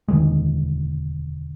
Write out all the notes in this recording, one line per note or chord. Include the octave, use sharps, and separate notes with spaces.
E1 D2 D#3 G#3